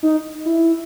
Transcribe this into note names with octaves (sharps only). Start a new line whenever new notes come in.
D#4
E4